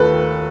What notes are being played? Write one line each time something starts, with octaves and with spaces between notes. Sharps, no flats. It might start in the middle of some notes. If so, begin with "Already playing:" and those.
Already playing: D#2 D#3 A3 A4 B4